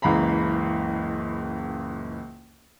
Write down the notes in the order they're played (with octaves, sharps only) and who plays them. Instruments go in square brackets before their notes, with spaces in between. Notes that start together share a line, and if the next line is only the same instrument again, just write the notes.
[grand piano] F#1 C#2 E3 F5 A#5 B5